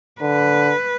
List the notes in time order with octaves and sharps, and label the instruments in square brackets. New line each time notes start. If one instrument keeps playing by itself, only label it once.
[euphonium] D3 [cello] B4